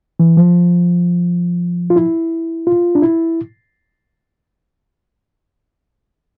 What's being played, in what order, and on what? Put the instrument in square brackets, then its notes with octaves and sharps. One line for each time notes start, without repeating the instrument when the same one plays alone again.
[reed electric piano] E3
F3
F4
E4
F4
D4
E4